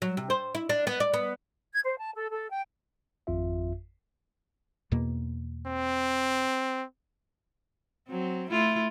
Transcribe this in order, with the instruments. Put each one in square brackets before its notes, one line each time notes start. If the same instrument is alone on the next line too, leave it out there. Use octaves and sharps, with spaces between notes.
[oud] F#3
C3
C5
E4
D4
B3
D5
B3
[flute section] G#6
C5
A5
A4
A4
G5
[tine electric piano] G#1 F2 F4 E5
[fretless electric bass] E2 B2 A#3
[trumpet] C4
[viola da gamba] F#3 C4
A3 E4 F4